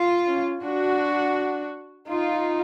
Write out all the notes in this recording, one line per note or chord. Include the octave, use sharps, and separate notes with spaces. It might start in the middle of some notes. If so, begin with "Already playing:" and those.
Already playing: F4
C#4
D4 F#4
D#4 F4